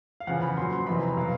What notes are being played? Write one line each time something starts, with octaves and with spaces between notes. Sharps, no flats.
F5
E2 C#3 F3 F#5
B5
A#2 F#3 C6
C6
F2 C3 E3 B5
A#5
B2 F#3 F5